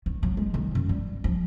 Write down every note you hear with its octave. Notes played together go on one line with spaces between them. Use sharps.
D#3
F#3
G#3
D#3
F#2
G3
F3